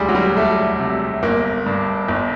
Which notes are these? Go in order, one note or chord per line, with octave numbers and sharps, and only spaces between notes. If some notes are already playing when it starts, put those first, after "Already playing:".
Already playing: E1 D2 G3 G#3
F#3
G3
E1 A3
C3
G1 A#3
G2
G1